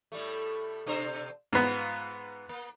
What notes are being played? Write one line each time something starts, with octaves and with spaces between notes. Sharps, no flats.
A2 G3 A3
B2 D4 C5
G#2 B3 F4
A#3